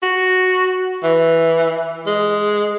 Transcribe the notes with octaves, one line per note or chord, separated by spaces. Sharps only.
F#4
E3
G#3